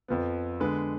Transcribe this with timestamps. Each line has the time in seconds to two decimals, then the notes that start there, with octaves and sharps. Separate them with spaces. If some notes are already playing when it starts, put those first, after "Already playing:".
0.08 F2 F3 B3
0.60 D3 G#3 B3 B4